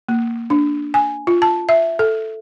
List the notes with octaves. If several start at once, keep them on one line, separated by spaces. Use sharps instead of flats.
A#3
D4
G#5
F4
A5
E5
A4